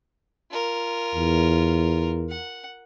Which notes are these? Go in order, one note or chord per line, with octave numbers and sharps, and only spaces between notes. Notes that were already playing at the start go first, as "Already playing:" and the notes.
F4 A#4
E2
F#5